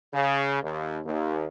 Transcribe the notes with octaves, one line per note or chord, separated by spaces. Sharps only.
C#3
D#2
D#2